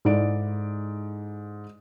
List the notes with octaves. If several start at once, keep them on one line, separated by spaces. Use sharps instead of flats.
G#2 E4 A4 D5 D7